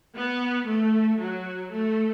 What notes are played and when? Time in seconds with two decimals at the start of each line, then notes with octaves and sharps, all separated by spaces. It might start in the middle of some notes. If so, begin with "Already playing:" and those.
0.16 B3
0.68 A3
1.19 F#3
1.71 A3